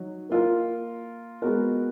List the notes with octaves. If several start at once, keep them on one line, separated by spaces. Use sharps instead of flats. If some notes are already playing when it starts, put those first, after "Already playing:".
Already playing: F#3 D#4
A#3 F4 A#4
G#3 B3 F#4 A#4